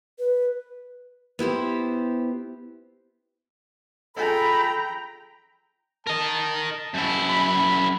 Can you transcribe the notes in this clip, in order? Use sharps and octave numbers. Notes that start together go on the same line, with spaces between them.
B4
B3 E4 G4 C5
F4 G#4 A4 G5 A#5 B5
A#4 D#5 A5
F#2 E4
B5